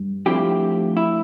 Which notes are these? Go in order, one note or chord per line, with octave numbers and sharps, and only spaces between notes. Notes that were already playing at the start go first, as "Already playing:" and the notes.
Already playing: G2
D2 D3 F3 C4 E4 G4
E4